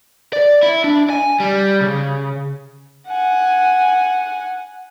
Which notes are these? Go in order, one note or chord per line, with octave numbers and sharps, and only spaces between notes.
D5
E4
D4
G#5
G3
C#3
F#5 G#5